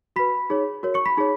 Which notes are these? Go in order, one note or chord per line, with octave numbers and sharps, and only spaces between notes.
F#4 B4 B5 B6
D#4 G#4 C#5
F#4 A#4 C#5
C#6 C#7
B5 B6
D#4 G#4 C#5